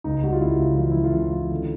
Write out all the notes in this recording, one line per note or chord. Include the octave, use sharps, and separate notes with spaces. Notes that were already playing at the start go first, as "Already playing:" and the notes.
C#2 D#4
G3 F#4
F4
C#2 E4
C#3
E3 F4
E4
E3
F4
C#3
E3
D3